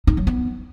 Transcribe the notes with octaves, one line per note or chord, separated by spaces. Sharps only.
D#4
F#3
B3